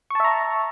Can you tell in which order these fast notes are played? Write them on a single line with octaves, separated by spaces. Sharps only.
C#6 A5 E5 A#5